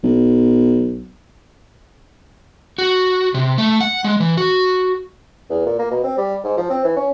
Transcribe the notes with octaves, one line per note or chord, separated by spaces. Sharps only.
B1
F#4
C3
A3
F#5
G#3
E3
F#4
E2
A#2
A#3
B2
C4
G3
G#2
F3
C4
E3
C#4